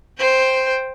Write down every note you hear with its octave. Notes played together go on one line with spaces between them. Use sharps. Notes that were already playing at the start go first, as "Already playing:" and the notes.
C5 G5